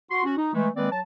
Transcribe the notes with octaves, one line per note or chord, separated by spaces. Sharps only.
F#4 C6
C#4 F#4
D#4
E3 G#3 A3
D#3 G#3 A#3 C4 B4 D5
F#3 A5